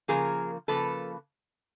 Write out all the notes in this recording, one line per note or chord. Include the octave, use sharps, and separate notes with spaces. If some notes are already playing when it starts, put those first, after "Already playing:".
C#3 F3 A#3 G#4 A#4
C#3 F3 A#3 A4 B4